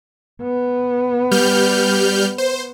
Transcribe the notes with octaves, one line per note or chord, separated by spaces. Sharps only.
B3
G3 F6 G6
C5